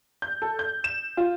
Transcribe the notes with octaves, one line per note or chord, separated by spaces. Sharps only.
G6
A4
G6
E7
F4